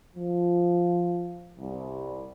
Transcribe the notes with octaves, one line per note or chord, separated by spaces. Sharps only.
F3
C2